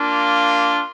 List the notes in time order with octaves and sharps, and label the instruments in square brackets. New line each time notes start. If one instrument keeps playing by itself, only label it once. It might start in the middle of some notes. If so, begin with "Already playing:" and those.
Already playing: [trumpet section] A#3 D4 F4